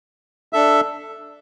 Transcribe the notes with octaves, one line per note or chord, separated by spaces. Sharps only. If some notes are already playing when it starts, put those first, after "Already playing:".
D4 A4 E5